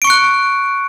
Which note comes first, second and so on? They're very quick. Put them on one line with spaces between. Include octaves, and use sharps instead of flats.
D7 C#6 C#7 F#6